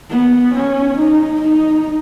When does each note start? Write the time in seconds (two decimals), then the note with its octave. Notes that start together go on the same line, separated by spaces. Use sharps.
0.11 B3
0.54 C#4
0.98 D#4
1.42 D#4